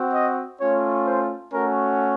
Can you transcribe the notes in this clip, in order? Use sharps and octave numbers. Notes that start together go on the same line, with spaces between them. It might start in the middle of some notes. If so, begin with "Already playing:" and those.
Already playing: C4 F#4
D#5
A3 C#4 F4 C#5
C5
A3 C#4 F#4 A#4